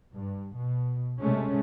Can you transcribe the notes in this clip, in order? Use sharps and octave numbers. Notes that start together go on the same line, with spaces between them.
G2
B2
C3 G#3 A3 C#4